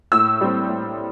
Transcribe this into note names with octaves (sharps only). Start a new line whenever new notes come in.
A2 E6
G3 C4
A2